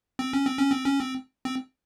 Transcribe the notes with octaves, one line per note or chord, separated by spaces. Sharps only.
C4
C#4
C4
C#4
C4
C#4
C4
C4